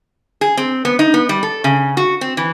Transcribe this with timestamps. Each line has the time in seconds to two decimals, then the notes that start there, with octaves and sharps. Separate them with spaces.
0.41 G#4
0.57 C4
0.85 B3
0.99 D#4
1.14 B3
1.29 G3
1.43 A4
1.64 C#3
1.97 F#4
2.21 C4
2.37 E3